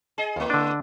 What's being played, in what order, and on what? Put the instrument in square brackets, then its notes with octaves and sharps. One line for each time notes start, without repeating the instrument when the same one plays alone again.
[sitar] G#4 D#5
[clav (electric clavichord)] D#2 [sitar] A3 E4
[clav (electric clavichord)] D3 D4